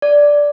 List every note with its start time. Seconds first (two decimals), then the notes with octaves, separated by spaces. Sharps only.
0.02 D5